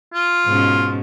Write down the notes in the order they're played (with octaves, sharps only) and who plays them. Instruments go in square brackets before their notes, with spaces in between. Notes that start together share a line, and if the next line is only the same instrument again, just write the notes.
[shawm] F4
[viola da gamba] G#2 B2 C#4